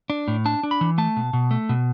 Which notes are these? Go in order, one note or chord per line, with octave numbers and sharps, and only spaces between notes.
D4
A2
D4 A5
D4
B5
E3
A3 A5
B2
B2
A3
B2